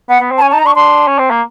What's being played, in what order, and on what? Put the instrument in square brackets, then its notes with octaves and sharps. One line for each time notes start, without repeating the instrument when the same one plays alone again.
[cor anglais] B3 [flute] F#5
[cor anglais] B3
C4
[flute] A5
[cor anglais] C#4 [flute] G#5
[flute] A5
[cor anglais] D#4 [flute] A#5
[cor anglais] D4 [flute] C#6
[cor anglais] D4 [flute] C6
[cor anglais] C#4
C4
A#3